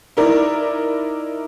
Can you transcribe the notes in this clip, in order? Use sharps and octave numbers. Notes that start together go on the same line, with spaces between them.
D#4 E4 A#4 D5